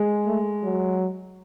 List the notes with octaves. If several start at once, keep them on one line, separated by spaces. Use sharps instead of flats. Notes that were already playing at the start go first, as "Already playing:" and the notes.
Already playing: G#3
A3
F#3